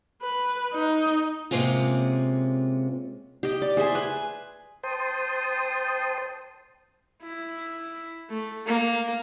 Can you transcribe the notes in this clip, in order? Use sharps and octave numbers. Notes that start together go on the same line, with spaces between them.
B4
D#4
C3 G#3 A#3 C4 C#4 F4
G4 D#5
D5
G#4 C5 E5 G#5
B4 G#5
C5 G5 A5 C6 D#6
E4
A3
A#3